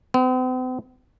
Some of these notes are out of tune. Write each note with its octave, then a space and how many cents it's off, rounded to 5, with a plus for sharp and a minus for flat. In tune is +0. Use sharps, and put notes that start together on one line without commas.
C4 -45